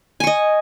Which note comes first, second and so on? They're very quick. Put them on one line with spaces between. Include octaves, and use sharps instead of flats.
G#5 C#6 D#5